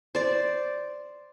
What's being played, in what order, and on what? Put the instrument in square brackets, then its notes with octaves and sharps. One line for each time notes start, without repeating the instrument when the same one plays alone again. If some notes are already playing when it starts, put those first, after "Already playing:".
[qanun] C5 D5